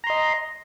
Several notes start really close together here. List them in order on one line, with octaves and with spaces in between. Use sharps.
A#5 C6 D#5